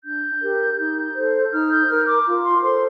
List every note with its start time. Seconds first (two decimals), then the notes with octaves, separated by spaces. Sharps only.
0.03 D4 G6
0.41 G4 A#4
0.78 D#4
1.14 A4 C5
1.52 D#4 F6
1.70 G6
1.88 A#4 F6
2.07 D6
2.25 F4
2.43 C6
2.62 A4 C5 C6